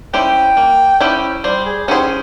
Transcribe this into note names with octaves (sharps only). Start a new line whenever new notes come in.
C#4 E4 G4 C5 G5
A#3
C#4 E4 G4 C5
G3 C5
G#4
C#4 E4 G4 G#4 C5